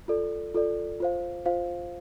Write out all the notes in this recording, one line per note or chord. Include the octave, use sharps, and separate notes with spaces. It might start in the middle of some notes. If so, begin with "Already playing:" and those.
F4 A4 D5
F4 A4 D5
F4 C5 F5
F4 C5 F5